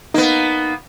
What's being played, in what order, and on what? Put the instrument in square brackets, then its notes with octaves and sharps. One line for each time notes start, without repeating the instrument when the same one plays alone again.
[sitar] A#3 B3 [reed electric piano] D#4